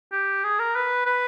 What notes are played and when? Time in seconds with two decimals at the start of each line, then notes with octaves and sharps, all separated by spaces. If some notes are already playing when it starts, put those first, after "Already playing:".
0.12 G4
0.44 G#4
0.59 A#4
0.76 B4
1.07 B4